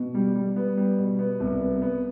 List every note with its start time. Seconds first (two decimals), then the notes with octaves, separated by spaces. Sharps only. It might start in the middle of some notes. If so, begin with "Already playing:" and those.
Already playing: B2
0.14 G3
0.35 G3
0.56 B3
0.77 G3
0.98 B2
1.19 B3
1.40 C2
1.61 B3
1.82 B3